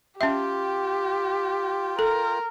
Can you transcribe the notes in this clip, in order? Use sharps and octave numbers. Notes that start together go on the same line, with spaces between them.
C#4 F4 G4 E5 G5
A4 A#4